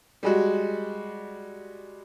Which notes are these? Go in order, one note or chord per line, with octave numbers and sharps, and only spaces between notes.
G3 G#3 F#4